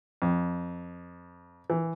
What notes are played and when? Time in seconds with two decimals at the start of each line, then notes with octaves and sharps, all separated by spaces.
0.22 F2
1.70 E3